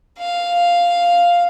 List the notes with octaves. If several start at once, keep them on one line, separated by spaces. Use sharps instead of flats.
F5